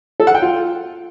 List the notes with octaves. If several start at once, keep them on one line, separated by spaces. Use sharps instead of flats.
A4
F#5
G5
F4